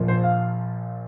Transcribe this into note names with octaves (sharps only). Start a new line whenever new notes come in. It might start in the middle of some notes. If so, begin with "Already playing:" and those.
Already playing: A#1 A#2 F3
C5
F5